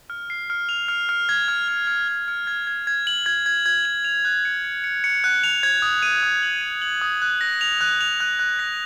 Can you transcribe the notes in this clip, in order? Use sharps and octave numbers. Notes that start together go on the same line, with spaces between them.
F6
C7
F6
F7
F6
F6
G#6
F6
F6
F6
F6
F6
G#6
G#6
G#6
F#7
G#6
G#6
G#6
F#7
F7
F#6
C#7
C#7
C#7
C#7
F#6
F7
G#6
D#6
D#7
D#6
F#7
D#7
F#7
D#6
F#6
A#6
F7
F#6
F7
F#6
F#6
A#6